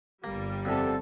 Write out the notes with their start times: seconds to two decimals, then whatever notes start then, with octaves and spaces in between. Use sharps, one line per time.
0.24 G1 G3 A#3
0.65 F2 C3 C4 A4 D5 F#5 E6